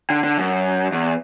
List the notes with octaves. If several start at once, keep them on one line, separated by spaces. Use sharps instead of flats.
D3
D3
F#2
E2